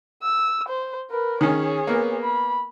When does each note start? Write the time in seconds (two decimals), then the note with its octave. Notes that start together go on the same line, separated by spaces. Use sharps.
0.22 E6
0.68 C5
1.11 A#4 B4
1.41 D#3 C#4 G#4 C#5
1.87 A#3 B3 A#4
2.22 B5